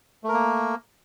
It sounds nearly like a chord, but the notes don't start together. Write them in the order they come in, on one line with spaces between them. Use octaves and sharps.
A3 A#4 A#3